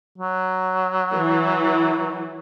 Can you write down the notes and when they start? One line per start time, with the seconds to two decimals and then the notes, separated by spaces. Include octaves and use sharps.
0.18 F#3
1.14 E3